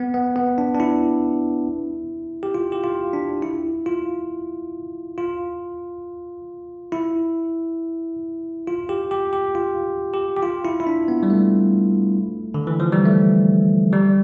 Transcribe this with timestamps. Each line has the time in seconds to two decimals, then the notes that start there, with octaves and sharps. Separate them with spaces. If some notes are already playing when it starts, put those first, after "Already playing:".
Already playing: B3
0.14 B3
0.36 B3
0.58 D4
0.75 D4
0.80 E4
2.43 G4
2.54 F4
2.72 G4
2.84 F4
3.13 D4
3.42 E4
3.86 F4
5.18 F4
6.92 E4
8.67 F4
8.89 G4
9.11 G4
9.33 G4
9.55 F4
10.14 G4
10.37 G4
10.43 F4
10.65 E4
10.80 E4
10.87 D4
11.08 B3
11.23 G3
11.30 A3
12.54 D3
12.67 E3
12.80 F3
12.92 G3
13.06 A3
13.93 G3